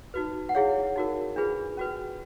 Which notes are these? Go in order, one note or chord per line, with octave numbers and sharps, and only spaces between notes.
D#4 F#4 B4
F#5
E4 G#4 C#5 F5
D#4 F#4 A#4
D4 F4 G#4 B4
C#4 F#4 B4